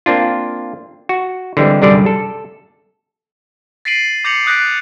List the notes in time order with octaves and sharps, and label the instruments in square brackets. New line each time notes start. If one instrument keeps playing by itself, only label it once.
[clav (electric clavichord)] A#3 C4 D4 F4
F#4
D3 E3 G3 G#3 C4
C2 F#2 D3 G3 G#4 D5
A4
[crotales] A6 B6 C7 D7 D#7 F#7
D6 G6 A#6 C#7 F7 F#7
D#6 F#6 G6 A#6 B6 D7